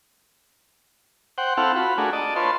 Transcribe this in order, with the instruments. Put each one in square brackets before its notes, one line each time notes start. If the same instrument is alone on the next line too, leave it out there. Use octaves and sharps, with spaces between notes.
[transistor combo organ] C5 F#5 G5
C4 E4 A4 F5 F#5
F4 F#4 B5
A3 D4 F#4 G#4 A#4
D5 D#5 A5
F4 B4 C#5 A5 C6